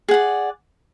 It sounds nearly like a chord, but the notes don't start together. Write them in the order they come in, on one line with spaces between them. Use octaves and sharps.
G#4 F#5 D5